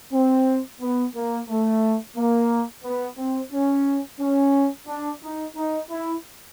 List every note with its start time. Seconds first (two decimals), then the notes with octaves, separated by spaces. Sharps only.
0.13 C4
0.81 B3
1.15 A#3
1.49 A3
2.16 A#3
2.84 B3
3.18 C4
3.53 C#4
4.20 C#4
4.87 D4
5.22 D#4
5.56 D#4
5.90 E4